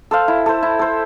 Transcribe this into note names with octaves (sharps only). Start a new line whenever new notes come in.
A4 C5 F5
E4
A4 C5
E4
A4 C5